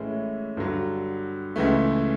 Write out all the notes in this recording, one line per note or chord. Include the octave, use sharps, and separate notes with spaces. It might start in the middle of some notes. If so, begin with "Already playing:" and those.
Already playing: A2 E3 G#3 C#4 E4
G2 D3 F#3
C#2 C#3 E3 A3